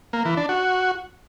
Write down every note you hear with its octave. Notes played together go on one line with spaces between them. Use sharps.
A#3
E3
D4
F#4